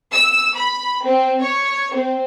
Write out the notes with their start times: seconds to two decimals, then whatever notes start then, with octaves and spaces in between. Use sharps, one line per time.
0.11 E6
0.55 B5
1.04 C4
1.41 C#5
1.93 C4